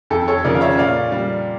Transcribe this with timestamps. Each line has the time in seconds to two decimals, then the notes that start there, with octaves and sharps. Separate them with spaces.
0.10 F2 A4
0.28 A4 C#5
0.45 C#3 F3 A#4 D5
0.55 F5
0.61 C#5 E5
0.78 A#2 D5 F5
1.12 G3